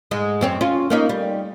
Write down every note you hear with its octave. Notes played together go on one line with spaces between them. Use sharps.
G#2 G#3
F#2 C4 C#5
C#4 F4
A#3 C#4 D#4
G3